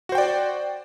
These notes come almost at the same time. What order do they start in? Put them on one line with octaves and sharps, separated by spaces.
F#4 C5 G5 D5